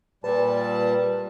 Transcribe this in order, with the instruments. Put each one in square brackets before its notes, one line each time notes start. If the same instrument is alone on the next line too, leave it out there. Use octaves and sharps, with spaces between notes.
[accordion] A#2 G3 A5 [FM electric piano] B4